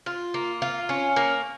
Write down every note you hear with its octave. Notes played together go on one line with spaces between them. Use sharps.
F4
A#3
F4
C#4
A#3